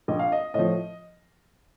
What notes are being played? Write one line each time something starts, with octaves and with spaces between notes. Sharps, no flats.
A#1 D#5
F5
D#5
A2 F3 D#5